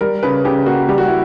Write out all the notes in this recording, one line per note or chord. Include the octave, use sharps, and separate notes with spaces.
G3 A#4
C#3 B4
C#3 G4
A#3 F#4
G3 G4
F#4
E4